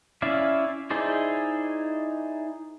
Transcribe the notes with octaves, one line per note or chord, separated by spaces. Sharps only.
C#4 E4 D5 E5 F5
D#4 E4 G#4 C5 D5